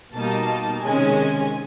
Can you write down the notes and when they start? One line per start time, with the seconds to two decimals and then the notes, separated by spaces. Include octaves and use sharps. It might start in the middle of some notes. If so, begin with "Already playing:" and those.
0.14 B2 G3 A#3 D#4 A5
0.84 C3 D#3 G#3 C#4 G#5